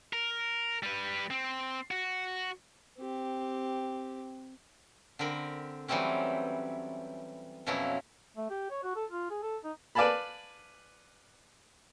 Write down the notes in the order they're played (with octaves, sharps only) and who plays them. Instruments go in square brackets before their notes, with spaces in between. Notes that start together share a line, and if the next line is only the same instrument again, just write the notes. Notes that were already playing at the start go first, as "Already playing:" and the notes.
[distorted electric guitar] A#4
G3 B4
C4
F#4
[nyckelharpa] C4 G4
[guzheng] D3 C4 A#4 B5
E3 F#3 G3 A3 C4 C#4
F2 B2 F3 F#3 C#4 E4
[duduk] A3
G4
C#5
F#4
A4
F4
G#4
A4
D#4
[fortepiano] B4 D5 F5 G#5 A5 B5